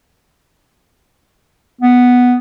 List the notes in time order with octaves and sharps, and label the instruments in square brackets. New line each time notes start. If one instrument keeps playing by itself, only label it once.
[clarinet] B3